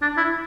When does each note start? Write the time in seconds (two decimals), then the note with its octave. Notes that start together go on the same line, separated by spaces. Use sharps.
0.02 D4
0.17 E4